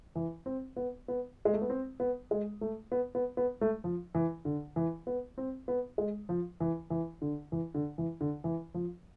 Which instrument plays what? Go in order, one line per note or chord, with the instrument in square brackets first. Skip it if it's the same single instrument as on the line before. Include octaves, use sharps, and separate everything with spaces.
[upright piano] E3
C4
B3
B3
G#3
A3
B3
C4
B3
G#3
A3
B3
B3
B3
A3
F3
E3
D3
E3
B3
C4
B3
G#3
F3
E3
E3
D3
E3
D3
E3
D3
E3
F3